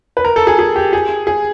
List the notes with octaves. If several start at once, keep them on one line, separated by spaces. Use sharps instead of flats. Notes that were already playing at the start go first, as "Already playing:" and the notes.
B4
A#4
A4
G#4
G#4
G4
G#4
G#4